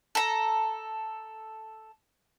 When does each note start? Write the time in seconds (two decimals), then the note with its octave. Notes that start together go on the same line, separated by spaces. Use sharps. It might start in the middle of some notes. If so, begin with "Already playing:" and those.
0.15 A4 A#5